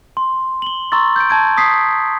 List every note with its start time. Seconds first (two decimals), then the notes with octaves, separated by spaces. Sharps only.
0.17 C6
0.62 F#7 G7
0.92 A#5 C6 C#6 E6 A6
1.16 G6 D7
1.30 A5 G#6 D7
1.57 D#6 B6 C7